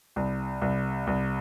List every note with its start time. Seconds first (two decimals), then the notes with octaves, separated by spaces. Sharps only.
0.16 C2
0.61 C2
1.07 C2